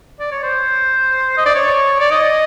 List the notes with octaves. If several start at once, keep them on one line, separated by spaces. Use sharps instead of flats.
D5
C#5
C5
D#5
D5
C#5
D5
D#5